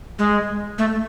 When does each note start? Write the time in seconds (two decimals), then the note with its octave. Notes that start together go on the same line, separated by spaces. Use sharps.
0.19 G#3
0.78 A3